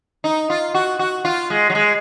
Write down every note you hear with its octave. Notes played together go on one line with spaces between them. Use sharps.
D#4
F4
F#4
F#4
F4
G#3
F#3
G#3